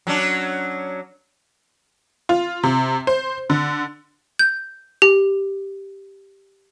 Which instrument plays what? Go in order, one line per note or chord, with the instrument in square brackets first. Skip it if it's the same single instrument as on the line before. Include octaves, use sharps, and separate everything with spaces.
[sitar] F#3 C#4 D4
[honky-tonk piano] F4
C3
C5
D3
[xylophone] G6
G4